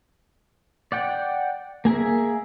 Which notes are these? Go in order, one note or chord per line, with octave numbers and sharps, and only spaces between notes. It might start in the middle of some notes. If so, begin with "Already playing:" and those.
D5 F#5 G5
A#3 G#4 A#4 E5